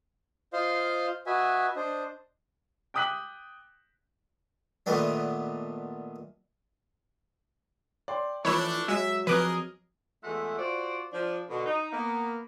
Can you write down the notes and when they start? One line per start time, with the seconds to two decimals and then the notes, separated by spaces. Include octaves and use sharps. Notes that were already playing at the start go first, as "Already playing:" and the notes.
0.53 F4 C5 D#5 F5 C6
1.26 F#4 B4 D#5 E5 G#5
1.76 D4 C5 D#5
2.94 G5 D6 D#6 F#6 B6 F#7
4.86 A#2 D#3 A3 B3 D4
8.08 D5 G5 C6
8.45 E3 F3 A3 D4 C#5 B5 E6
8.88 F#3 G#3 E5
9.27 F3 C4 G#4 A#4 B4 D#5 D6 F#6
10.23 E2 G#3 A3 F4 E5 F#5
10.57 F4 F#4 C5 D5
11.13 F3 D4
11.49 B2 D3
11.66 D#4
11.92 A#3 B3